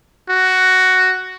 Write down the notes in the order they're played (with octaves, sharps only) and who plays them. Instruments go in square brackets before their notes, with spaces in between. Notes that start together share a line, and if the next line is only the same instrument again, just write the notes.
[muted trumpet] F#4